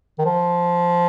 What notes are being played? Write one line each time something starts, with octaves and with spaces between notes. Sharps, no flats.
D#3
F3